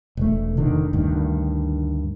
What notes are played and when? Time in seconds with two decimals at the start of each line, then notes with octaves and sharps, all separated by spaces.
0.17 E1 A3
0.57 F1 D3 D#3
0.93 D2 G2 D#3